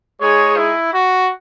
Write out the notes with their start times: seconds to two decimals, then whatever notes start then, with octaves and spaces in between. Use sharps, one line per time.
0.21 G#3 D#4 G#4 C#5
0.57 E4
0.94 F#4